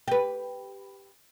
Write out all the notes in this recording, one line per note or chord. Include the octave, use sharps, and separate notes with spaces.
G4 B4